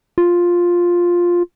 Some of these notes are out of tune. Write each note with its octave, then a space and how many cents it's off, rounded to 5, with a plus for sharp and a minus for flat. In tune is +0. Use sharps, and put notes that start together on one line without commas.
F4 +5